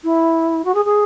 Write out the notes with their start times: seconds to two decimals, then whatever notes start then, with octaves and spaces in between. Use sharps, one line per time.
0.03 E4
0.64 F#4
0.74 G#4
0.84 G#4